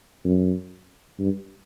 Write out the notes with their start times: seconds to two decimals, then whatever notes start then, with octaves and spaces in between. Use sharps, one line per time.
0.24 F#2
1.19 G2